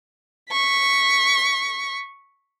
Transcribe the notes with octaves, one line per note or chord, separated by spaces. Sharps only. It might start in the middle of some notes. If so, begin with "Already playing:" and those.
C#6 B6